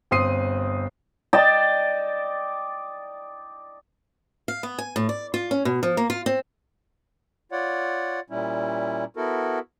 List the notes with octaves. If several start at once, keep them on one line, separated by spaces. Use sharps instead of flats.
G1 C4 C6 D#6 C7 D#7
D5 D#5 G5 A5
F5
B3
G#5
A2
D5
F4
C#4
B2
F3
A#3
F4
C4
F4 C#5 D5 F#5
A#2 G3 C#4 E4
B3 E4 F#4 A4 A#4